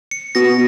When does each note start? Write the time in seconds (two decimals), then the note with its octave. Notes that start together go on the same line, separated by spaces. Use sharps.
0.11 C#7
0.35 B2 A#6